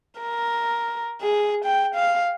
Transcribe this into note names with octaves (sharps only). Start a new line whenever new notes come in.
A#4
G#4
G5
F5